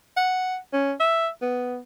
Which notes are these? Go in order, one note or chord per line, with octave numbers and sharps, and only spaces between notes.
F#5
C#4
E5
B3